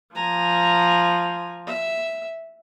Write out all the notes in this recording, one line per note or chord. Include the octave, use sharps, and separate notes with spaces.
F3 G#5 A#5
E5